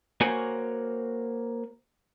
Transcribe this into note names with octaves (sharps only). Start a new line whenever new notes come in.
A#3 F#4 C5 C#5 G#5